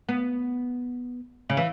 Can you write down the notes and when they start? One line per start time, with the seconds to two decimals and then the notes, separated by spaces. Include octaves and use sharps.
0.09 B3
1.50 C#3
1.57 E3